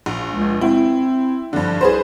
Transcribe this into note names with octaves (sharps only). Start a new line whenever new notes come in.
A#1
C#2
C4 E4
G2 D3 F3
C2 G#4 B4 C5